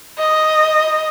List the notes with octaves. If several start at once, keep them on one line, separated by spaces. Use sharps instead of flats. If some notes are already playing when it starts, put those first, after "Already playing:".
D#5